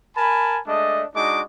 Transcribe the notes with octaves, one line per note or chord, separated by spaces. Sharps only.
A#4 G#5 A5 B5
G#3 A3 D4 D5 D#5
G#3 D4 D#4 F#4 D#5 D6